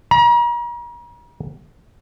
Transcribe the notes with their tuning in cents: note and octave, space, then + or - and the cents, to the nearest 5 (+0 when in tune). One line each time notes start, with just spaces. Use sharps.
A#5 +40